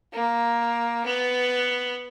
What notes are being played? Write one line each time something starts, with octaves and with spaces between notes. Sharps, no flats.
A#3
B3